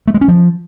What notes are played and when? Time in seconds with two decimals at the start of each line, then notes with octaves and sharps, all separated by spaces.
0.08 A3
0.14 G#3
0.21 C#4
0.28 F3